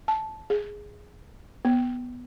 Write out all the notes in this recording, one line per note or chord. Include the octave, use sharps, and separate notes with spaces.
A5
G#4
B3